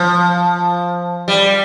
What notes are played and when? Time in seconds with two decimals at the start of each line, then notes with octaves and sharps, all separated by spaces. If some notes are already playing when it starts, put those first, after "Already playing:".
Already playing: F3
1.28 G3